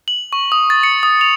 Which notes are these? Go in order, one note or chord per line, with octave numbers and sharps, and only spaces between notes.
F#7
C#6
D#6
A6
C#7
D#6
F7